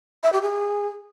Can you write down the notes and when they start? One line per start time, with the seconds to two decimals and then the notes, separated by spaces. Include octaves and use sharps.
0.23 E5
0.33 G4
0.42 G#4